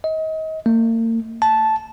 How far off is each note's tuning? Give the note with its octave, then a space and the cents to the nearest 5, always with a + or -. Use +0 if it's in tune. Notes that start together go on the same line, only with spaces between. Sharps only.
D#5 +30
A#3 -40
A5 -10